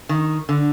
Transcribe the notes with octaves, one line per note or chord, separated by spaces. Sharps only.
D#3
D3